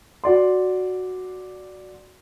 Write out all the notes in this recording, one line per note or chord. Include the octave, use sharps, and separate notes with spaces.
F#4 D5 C6